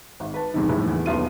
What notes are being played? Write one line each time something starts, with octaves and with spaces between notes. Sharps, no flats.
G#1
B4 A5
E2 G2 C3 D#3
A#1 A2 E4
E2
D#1 B1 B3 F4 E5 D#7